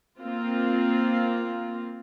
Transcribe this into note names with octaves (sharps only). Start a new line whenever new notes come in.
A#3 C4 F4